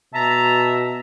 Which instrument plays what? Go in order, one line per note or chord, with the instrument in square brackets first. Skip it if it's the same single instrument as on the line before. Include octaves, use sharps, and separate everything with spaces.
[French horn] B2 [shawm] E5 [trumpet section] A5 A#5